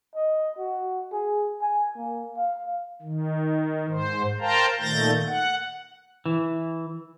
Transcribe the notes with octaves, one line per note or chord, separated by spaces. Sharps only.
D#5
F#4
G#4
G#5
A#3
F5
D#3
G#2 C5
A#4 C5 F5 G5 A5 A#5
A#2 D#3 A3 G6 A6 A#6
F#5
E3